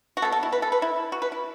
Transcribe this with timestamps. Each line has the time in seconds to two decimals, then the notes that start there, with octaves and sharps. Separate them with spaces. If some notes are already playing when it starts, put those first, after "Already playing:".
0.17 F#4
0.22 B2 B3 A4
0.32 A4
0.43 E4
0.53 B4
0.62 A4
0.72 B4
0.82 E4
1.12 F#4
1.22 B4
1.32 E4